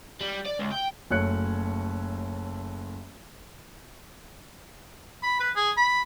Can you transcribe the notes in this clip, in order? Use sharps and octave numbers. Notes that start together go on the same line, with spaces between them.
G3
D5
C#2
G5
F#1 A3 C#5 F#6 C#7
B5
B4
G#4
B5